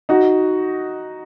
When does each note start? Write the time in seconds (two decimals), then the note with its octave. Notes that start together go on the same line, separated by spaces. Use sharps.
0.09 D#4 F#4